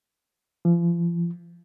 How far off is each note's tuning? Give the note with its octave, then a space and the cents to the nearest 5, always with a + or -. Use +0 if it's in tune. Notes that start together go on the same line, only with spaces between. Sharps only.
F3 -40